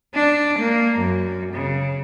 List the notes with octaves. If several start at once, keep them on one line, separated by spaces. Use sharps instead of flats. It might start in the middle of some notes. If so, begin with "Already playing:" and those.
D4
A#3
F#2
C#3